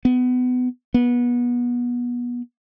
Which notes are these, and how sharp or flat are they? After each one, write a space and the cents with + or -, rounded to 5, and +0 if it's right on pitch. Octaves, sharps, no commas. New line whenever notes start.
B3 +25
B3 -25